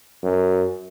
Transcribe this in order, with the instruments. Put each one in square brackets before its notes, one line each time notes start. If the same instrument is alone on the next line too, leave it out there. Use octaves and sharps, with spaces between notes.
[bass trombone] F#2